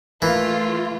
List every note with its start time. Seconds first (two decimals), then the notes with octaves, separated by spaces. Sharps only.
0.22 E3 A3 A#3 F4